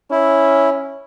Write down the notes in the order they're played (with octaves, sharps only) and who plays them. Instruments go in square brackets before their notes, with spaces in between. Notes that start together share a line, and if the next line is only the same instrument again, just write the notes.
[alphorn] C#4 [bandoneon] E4